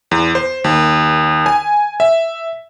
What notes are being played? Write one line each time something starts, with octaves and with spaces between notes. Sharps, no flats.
E2
C5
D#2
G#5
E5